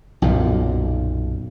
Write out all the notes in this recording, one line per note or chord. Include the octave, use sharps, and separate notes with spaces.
B1 F#2 A#2